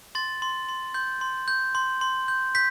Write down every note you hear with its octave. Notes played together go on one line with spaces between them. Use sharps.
C6 A6
C6
C6
C6 G6
C6
G6
C6
C6
G6
G6 B6